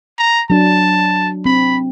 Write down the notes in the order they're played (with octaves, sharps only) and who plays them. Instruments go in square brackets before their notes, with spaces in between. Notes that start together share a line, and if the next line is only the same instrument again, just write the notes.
[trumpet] A#5
[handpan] F#3 D4 [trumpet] A5
[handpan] C4 [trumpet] B5